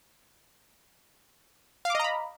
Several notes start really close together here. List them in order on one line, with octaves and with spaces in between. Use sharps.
F5 D6 D#5 A#5 B5